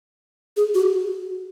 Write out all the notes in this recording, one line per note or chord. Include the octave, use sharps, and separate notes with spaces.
G#4
F#4